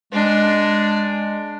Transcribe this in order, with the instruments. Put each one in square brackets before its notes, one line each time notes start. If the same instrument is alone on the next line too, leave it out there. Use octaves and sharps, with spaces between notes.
[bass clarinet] G#3 [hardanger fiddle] D4